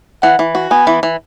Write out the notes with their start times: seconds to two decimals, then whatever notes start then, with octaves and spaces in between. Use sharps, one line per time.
0.22 E3 F#5
0.39 E3
0.55 F#4
0.71 B3 G#5
0.87 E3
1.03 E3